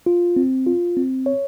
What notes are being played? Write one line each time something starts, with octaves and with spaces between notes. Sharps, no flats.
F4
C4
F4
C4
C#5